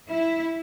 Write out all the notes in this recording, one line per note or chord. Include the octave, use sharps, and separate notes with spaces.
E4